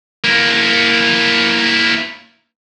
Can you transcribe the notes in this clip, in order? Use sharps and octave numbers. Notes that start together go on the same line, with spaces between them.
A#3 E4